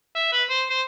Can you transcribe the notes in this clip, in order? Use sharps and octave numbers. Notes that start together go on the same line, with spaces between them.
E5
B4
C5
C5